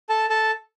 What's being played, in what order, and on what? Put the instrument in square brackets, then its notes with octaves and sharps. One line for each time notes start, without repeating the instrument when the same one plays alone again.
[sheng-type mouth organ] A4 A5
A4 A5